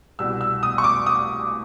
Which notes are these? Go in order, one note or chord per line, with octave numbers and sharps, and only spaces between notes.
C2 B2 G3 E6
E6
D#6
C#6
D6
D#6